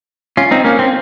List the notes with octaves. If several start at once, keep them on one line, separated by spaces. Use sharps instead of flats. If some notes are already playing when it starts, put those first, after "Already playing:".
C#4 F4
C4 D#4
A#3 C#4
C4